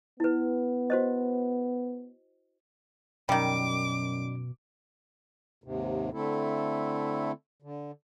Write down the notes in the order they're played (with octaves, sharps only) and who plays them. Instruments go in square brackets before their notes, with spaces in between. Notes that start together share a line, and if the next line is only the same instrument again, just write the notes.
[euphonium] B3 [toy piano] E4 B4
[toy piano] F#4 C5 D#5
[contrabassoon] F#2 [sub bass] B2 [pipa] D#3 G3 [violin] D6
[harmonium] D#2 G#2 C3
D3 A3 C4 E4 A4
D3